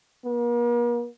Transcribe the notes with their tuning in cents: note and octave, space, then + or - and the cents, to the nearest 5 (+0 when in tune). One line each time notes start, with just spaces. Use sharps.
A#3 +45